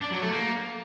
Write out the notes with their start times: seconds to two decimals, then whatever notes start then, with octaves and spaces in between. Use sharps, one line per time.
0.01 D4
0.12 F#3
0.22 A3
0.32 A#3